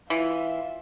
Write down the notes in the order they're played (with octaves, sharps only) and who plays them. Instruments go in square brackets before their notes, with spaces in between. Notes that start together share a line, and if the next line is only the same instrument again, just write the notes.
[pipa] E3 [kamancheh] F4 E5